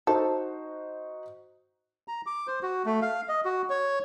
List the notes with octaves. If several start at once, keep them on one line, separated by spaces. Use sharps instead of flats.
D#4 F#4 A4 C5
A#5
D6
C5
F#4
A3
F5
D#5
F#4
C#5